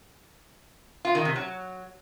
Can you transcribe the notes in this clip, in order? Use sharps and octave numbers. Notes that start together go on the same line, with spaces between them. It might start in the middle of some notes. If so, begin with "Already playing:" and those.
F4
D#3
C3
F#3